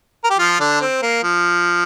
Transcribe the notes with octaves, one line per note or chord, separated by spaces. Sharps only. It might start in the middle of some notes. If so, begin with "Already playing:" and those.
A#4
G4
F3 F4
D3 D4
C4
A#3
F3